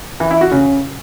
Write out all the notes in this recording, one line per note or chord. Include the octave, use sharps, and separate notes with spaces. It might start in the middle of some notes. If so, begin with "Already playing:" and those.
E3
E4
F#4
C#3